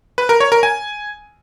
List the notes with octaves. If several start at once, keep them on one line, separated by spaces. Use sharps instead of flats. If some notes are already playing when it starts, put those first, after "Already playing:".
B4
A#4
C#5
A#4
G#5